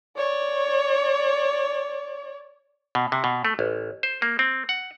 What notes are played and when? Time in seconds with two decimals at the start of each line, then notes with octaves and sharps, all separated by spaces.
0.17 C#5 D5
2.95 B2
3.12 C3
3.24 B2
3.45 A3
3.59 A1
4.03 C5
4.22 A#3
4.39 C4
4.69 F#5